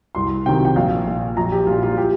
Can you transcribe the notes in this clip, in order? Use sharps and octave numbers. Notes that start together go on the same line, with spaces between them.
C2 C6
C3 D#3 G5
G5
A#1 F5
A#2
A#1 A#5
G4
A#2 F4
F4
G4